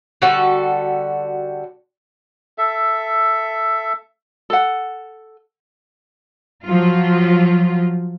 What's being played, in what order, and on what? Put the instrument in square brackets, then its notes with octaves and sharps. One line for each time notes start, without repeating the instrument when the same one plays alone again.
[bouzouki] D3 G3 F#4 A4
[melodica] A4 E5
[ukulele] A4 F#5
[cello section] F3 F#3 F4